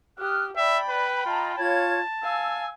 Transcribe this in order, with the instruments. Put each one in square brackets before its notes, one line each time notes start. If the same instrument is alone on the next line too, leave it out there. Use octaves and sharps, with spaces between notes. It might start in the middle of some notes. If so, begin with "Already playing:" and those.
[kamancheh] G4 [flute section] D#6 F6 F#6
[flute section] D5 [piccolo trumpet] E5 [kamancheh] G5 B5
[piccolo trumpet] B4
[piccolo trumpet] F4 [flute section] D#5 A5 A#5
[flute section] F4 C#5 G#6 [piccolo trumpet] A5
[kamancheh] F5 G#5 [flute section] E6